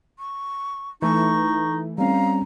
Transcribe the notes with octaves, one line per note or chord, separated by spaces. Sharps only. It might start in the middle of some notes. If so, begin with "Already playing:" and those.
C#6
E3 A3 D#4 C#6
G3 C4 C#4 F5 A#5